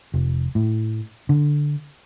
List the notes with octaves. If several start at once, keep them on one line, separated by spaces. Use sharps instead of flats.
F1
A2
D3